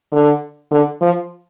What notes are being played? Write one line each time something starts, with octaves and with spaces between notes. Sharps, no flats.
D3
D3
F3